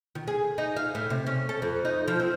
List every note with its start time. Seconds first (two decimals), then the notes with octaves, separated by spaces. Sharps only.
0.15 D#3
0.28 G#4
0.58 D#4
0.76 F5
0.95 A2
1.10 C3
1.26 C#4
1.49 A4
1.62 F2
1.85 D#4
2.08 F3
2.20 C4